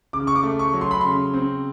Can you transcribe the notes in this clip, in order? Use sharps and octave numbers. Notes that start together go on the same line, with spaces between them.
C#3 D6
C#6
D6
A3
C#6
F#3
C6
B5
C#3 C6
C4